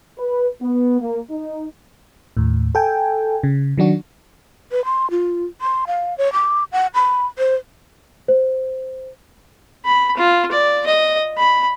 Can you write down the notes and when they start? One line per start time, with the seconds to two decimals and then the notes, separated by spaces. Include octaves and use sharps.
0.18 B4
0.60 B3
1.00 A#3
1.30 D#4
2.37 D#2 A2
2.75 A4 G5 G#5
3.43 C#3
3.78 D#3 F#3 D4 F#4
4.71 B4
4.85 C6
5.11 F4
5.61 C6
5.87 F5
6.18 C#5
6.33 D6
6.72 F#5
6.95 B5
7.39 C5
8.28 C5
9.85 B5
10.17 F4
10.51 D5
10.86 D#5
11.37 B5